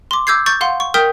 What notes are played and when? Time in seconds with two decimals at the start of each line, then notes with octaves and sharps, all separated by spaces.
0.11 C6 D6
0.27 D6 E6 G6 G#6 C7
0.46 C#6 G6 A6
0.61 F5 F#5 C6
0.80 C#6
0.94 A#4 G5 D#6 F6 G6 B6